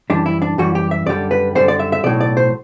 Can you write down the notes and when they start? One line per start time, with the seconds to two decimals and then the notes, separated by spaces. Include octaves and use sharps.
0.10 F#2 E3 G3 D4
0.26 E4
0.42 D4
0.58 F#2 E3 G3 F#4
0.75 G4
0.91 E5
1.07 F#2 D3 G3 D5
1.31 B4
1.55 F#2 D3 G3 C5
1.68 D5
1.79 E5
1.92 E5
2.04 B1 A2 F#3 D5
2.21 D5
2.37 C5